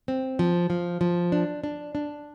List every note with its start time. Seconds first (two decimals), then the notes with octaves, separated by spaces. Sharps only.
0.08 C4
0.39 F3
0.70 F3
1.01 F3
1.32 D4
1.64 D4
1.95 D4